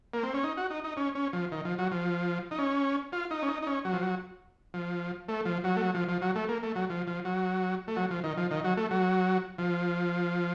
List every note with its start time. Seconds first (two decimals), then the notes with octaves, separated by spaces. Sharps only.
0.14 A#3
0.23 C4
0.34 C#4
0.43 D#4
0.57 F#4
0.70 D#4
0.84 D#4
0.97 C#4
1.15 C#4
1.33 F3
1.52 D#3
1.65 F3
1.78 F#3
1.91 F3
2.51 D#4
2.59 C#4
3.12 F4
3.31 D#4
3.42 C#4
3.48 D#4
3.62 D#4
3.67 C#4
3.85 F#3
3.93 F3
4.02 F#3
4.74 F3
5.28 A3
5.45 F3
5.64 F#3
5.77 A3
5.81 F#3
5.95 F3
6.08 F3
6.22 F#3
6.35 A3
6.49 A#3
6.63 A3
6.76 F#3
6.90 F3
7.07 F3
7.25 F#3
7.88 A3
7.96 F#3
8.10 F3
8.24 D#3
8.37 F3
8.51 D#3
8.64 F#3
8.77 A3
8.91 F#3
9.58 F3